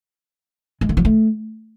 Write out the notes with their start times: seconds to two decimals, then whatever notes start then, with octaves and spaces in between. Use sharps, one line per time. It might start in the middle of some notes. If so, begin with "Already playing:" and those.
0.81 G#3
0.89 D3
0.97 F#3
1.05 A3